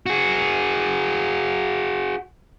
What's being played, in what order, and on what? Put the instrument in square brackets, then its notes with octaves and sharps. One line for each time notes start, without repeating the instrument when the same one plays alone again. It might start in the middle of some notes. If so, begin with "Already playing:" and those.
[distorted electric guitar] F#4 G#4